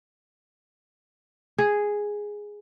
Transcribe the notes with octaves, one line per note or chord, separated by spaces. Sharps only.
G#4